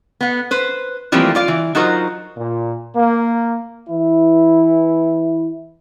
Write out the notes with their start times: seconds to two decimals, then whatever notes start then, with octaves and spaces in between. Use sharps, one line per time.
0.21 B3 F#5
0.51 B4 C5
1.12 E3 F3 G3 A3 A#3 C4
1.35 F4 D5 F5
1.48 E3
1.75 F#3 D#4 F4 F#4 A#4 C5
2.37 A#2
2.96 A#3
3.89 E3 E4